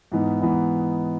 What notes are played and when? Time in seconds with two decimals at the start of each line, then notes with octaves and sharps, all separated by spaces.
0.12 G#2 E3 B3 D#4
0.41 G#2 E3 B3 D#4